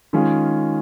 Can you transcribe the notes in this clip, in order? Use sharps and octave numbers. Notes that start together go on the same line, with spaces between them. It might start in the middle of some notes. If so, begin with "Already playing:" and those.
D#3 G#3 C#4 F4 G#4